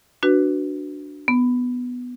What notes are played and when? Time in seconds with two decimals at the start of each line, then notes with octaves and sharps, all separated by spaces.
0.23 D4 F#4 B4
1.28 B3